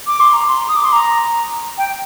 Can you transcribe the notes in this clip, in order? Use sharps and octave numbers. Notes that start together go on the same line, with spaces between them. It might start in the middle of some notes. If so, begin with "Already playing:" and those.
D6
C6
A#5
C6
D#6
D6
C6
A#5
G5